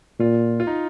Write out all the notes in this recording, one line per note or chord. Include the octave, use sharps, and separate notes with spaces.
A#2 F4
F4
D#4